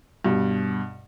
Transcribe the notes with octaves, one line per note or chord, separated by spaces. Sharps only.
G2 B2